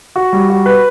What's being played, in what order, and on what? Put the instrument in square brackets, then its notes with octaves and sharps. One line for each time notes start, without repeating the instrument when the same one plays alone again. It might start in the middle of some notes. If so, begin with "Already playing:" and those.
[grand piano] F#4
G3
F#4
B4